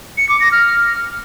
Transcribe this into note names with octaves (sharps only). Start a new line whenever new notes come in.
C#7
D6
A#6
F6